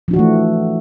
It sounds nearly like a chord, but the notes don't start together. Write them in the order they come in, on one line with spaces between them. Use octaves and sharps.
F3 D4 F#4 E3 A3